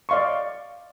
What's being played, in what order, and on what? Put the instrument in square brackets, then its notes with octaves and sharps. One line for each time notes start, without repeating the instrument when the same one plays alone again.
[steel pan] D5 D#5 F5 C6 C#6